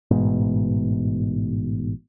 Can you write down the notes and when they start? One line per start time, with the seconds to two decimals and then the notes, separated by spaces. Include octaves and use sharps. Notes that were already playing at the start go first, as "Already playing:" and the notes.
0.11 A1 G#2 B2